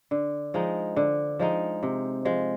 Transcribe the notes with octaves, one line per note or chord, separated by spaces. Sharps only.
D3
F3 G#3 D#4
D3
F3 G#3 D#4
C3
F3 G#3